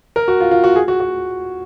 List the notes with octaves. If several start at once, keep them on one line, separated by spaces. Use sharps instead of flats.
A#4
F#4
F4
F4
F#4
G#4
F#4
F#4